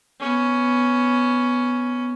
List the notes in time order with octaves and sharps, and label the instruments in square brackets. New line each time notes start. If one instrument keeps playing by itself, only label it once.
[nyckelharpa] B3 C#4